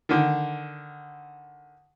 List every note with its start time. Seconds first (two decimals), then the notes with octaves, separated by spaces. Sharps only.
0.09 D3 D#3